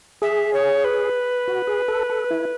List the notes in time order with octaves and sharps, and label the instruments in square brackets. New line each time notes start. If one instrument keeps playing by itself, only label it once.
[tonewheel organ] G#4 [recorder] E5
[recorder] C#5
B4
[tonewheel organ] F#4
G#4
A4
A4
E4